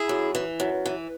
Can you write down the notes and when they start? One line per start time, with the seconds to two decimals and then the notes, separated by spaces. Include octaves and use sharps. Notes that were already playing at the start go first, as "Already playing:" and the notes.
Already playing: E4 G#4
0.09 F#2
0.35 E3
0.60 F#2
0.86 E3